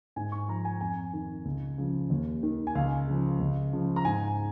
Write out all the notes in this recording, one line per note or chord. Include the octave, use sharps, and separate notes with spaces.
G#2 G#5
C#6
F3 A#5
G#5
F2 G#5
D#3
C#2
C#3 F3
D#2
D#3
G#5
C#2 F5
C#3 F3
C#2
C#3 F3
A#5
G#2 G#5